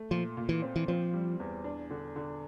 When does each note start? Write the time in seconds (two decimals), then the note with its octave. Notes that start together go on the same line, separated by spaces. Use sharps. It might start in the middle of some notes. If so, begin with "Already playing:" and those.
Already playing: A3
0.11 A#2 F3
0.37 A#2
0.49 E3
0.62 C4
0.76 E3
0.88 F3 C4
1.13 G3
1.40 E2
1.64 D4
1.91 D3
2.16 D3